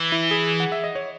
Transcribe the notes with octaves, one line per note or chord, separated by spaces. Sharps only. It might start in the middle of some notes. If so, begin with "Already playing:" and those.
Already playing: E3
E4
G#4
F#5
E5
D#5
C#5